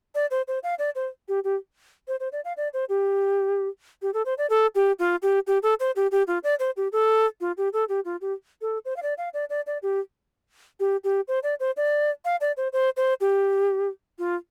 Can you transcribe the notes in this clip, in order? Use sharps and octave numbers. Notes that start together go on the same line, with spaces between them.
D5
C5
C5
F5
D5
C5
G4
G4
C5
C5
D5
F5
D5
C5
G4
G4
A4
C5
D5
A4
G4
F4
G4
G4
A4
C5
G4
G4
F4
D5
C5
G4
A4
F4
G4
A4
G4
F4
G4
A4
C5
F5
D5
F5
D5
D5
D5
G4
G4
G4
C5
D5
C5
D5
F5
D5
C5
C5
C5
G4
F4